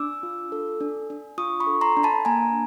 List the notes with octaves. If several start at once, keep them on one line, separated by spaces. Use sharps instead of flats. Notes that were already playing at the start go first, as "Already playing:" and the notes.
Already playing: D4 D6 E6
F4
A4
D4
D4
F4 C#6 D#6
B5 C#6
A4
A#5 C6
D4
A5 B5
A#3 G#5 A#5